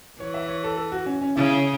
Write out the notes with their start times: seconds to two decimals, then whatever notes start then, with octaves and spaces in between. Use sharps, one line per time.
0.20 E3 C#5
0.34 E5
0.48 C#5
0.64 A4
0.77 A4
0.92 F#4
1.06 C#4
1.21 C#4
1.36 C#3 E4